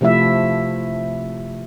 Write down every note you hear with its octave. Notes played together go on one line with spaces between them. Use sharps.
C3 F3 A3 E4 E5